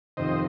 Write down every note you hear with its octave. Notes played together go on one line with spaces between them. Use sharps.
F2 C3 D#3 C5 D#5